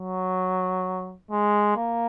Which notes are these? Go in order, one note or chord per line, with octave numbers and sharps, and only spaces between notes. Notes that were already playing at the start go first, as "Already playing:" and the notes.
Already playing: F#3
G#3
A#3